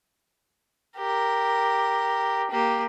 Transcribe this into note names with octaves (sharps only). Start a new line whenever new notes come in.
G4 A#4
A#3 G4